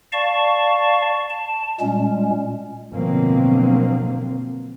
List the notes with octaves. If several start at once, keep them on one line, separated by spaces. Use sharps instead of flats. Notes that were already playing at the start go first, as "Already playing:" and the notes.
D5 F5 A5 C#6
A5
A#2 G3 G#3 C#4
B2 D3 F3 F#3 A#3 C4